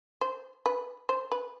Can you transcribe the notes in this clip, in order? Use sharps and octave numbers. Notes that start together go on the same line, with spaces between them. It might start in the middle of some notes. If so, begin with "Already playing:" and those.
C5
B4
C5
B4